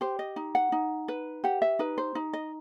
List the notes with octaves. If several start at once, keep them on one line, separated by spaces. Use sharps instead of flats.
G4 C5
D#5
D#4
F#5
D#4
B4
G4 F#5
E5
D#4 B4
C5
D#4
D#5